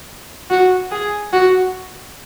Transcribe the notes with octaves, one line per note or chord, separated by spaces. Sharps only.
F#4
G#4
F#4